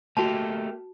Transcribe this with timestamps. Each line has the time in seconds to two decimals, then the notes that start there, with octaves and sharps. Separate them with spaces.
0.17 A3 A#3 F#4 G4 A5